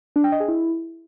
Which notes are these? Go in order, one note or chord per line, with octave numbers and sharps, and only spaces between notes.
D4
G5
D#5
G#4
E4